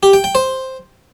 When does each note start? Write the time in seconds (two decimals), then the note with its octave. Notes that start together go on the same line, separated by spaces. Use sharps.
0.03 G4
0.13 G5
0.24 G5
0.35 C5